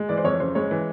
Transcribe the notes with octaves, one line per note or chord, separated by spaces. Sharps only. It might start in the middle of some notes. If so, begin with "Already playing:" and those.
Already playing: G#3
E3 D5
C5
F2 C#5
C#3 C5
G#3 C#5
E3